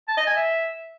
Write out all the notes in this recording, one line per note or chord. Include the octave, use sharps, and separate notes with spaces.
A5
D#5
G#5
E5